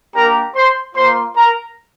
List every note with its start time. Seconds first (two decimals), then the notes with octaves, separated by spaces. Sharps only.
0.14 A#3 D4 G4 A#4 A#5
0.55 C5 C6
0.95 A#3 F4 C5 C6
1.36 A#4 A#5